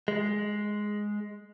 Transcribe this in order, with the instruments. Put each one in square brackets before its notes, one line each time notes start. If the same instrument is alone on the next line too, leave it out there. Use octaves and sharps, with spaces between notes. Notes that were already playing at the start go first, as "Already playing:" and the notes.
[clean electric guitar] G#3